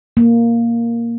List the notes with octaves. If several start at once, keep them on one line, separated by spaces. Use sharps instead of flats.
A#3